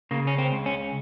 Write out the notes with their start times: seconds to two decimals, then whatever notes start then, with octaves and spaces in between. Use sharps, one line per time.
0.11 C#3 A#3
0.27 C#4
0.38 C4
0.52 C#2
0.66 C#4